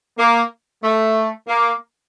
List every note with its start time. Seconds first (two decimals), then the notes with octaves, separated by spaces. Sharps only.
0.19 A#3
0.83 A3
1.48 A#3